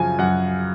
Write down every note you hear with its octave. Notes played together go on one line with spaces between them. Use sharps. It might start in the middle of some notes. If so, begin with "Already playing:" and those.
Already playing: F#2 C#3 F3 G#5
F#2 F#5